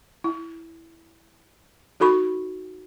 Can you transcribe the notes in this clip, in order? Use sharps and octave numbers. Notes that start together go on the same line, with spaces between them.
E4
D#4 F#4 A4 B5 C#6